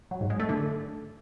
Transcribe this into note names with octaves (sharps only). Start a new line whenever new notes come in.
F#3
G#2
G#3
A3
D3